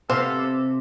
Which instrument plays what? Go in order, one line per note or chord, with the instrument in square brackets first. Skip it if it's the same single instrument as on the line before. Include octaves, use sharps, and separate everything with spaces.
[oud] C3 [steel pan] B3 F5 [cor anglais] A4 [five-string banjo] C5